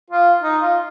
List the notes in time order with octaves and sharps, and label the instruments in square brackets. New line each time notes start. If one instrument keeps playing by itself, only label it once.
[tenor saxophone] F4
D#4
F4